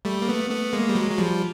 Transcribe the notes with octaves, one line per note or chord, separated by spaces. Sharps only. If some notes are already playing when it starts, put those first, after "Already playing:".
G3 A3
A#3
A3 B3
A3 B3
G#3 A#3
G3
F#3 G#3
F#3
F3 G3